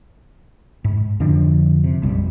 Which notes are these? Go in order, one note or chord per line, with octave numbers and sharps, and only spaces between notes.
G#2
F2 D3 F3 D4
C3
A#1 F2 G3